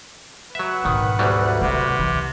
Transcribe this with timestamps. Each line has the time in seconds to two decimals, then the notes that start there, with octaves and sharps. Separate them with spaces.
0.55 F#3 B4 E5 F#5
0.85 G#2 B2 D#3
1.19 D2 F#3 G3
1.61 C3 A#3
1.99 C#2 E3